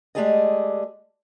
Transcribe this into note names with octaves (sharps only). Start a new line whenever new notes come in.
G#3 A3 G4 G#4 D5 D#5